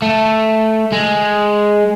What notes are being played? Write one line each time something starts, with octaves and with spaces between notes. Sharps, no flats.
A3
G#3